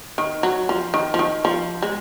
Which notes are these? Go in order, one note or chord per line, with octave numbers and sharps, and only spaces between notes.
D#3
F#3
F3
D#3
F3
D#3
F3
G#3